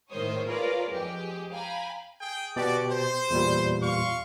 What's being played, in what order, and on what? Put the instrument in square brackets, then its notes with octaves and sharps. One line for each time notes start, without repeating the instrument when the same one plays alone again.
[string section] A2 D#3 G#3 C5 C#5 D#6
F4 G#4 A#4 B4 C#5 D5
F2 G#3 G4
F5 G5 G#5 A#5 B5
[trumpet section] G#4 G5
[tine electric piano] B2 G4 [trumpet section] F#4 D5
[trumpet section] C5
[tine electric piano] E2 A#2 G3
[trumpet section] F5 C6 C#6